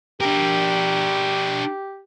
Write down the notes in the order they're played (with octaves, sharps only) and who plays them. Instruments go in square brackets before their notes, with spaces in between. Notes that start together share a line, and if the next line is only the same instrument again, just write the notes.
[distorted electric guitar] D4 A#4 [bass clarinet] G4